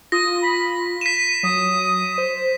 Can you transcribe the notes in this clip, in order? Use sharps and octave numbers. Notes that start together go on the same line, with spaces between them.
F4 D#6 A#6
B5
B6 D#7 E7
F#3 D#6
C5